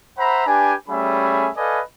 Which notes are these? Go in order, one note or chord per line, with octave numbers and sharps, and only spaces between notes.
C5 E5 F#5 A#5 B5
D4 G4 B4 G#5
G3 A3 C#4 G#4 E5 B5
A4 B4 D5 D#5 F5 G#5